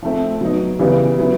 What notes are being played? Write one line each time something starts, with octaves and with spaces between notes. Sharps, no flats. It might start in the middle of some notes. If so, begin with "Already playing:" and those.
F3 A3 C4
F#3 B3 D#4
C#3 E3 G3 B3
F#3 B3 E4